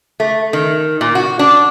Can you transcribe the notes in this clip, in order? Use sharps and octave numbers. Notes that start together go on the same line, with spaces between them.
A3
D#3
A#2
F#4
D4